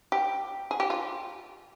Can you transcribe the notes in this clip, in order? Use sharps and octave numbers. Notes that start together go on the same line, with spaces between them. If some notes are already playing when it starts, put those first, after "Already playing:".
G4
G#4
G4
F4